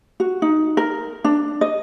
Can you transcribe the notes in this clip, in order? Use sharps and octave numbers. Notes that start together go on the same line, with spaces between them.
F#4
D#4
A#4
D4
D#5